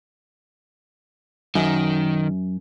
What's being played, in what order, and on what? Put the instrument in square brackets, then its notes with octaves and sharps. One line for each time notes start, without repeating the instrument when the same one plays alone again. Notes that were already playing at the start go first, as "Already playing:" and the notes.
[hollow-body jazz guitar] F#2 [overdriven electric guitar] D#3